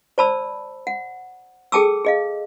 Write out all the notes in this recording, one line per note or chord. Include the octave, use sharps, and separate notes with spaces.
C5 D5 A5 B5 E6
F#5
G#4 A4 G5 A5 D6 E6
G#4 D#5 F5